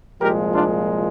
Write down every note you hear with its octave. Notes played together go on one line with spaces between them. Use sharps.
C2 A#2 F3 G#3 G4 A#4
D4 F4